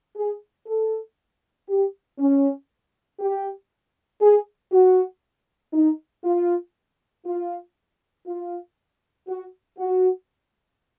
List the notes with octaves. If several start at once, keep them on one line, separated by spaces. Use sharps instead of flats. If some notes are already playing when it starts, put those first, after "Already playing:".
G#4
A4
G4
C#4
G4
G#4
F#4
D#4
F4
F4
F4
F#4
F#4